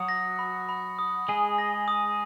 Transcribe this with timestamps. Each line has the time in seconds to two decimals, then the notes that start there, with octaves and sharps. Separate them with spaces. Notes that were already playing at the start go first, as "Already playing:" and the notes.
Already playing: F#3 F#4 D#6
0.09 A#6
0.39 B5
0.69 B5
0.99 D#6
1.28 G#3 G#4 G#5
1.58 A#6
1.88 D#6